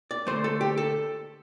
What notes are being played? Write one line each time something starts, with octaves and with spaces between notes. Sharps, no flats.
D5
D3 A3 C5
A4
G4
A4